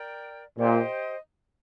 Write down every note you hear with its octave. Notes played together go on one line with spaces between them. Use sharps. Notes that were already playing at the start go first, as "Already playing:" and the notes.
Already playing: A#4 D5 G5
A#2 G4 C5 D#5